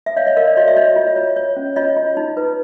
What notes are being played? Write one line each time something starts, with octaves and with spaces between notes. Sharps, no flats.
E5
C#5 D#5 F5
C#5 D#5
A#4 D#5 F5
D5 E5
F#4 C#5 D#5
E5
F#4 C#5 D#5
F4
C#5
C#5
C#4
F4 C#5 D#5
F4
D#4
B4